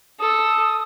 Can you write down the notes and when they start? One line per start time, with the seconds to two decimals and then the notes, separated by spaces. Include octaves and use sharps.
0.20 A4 D#6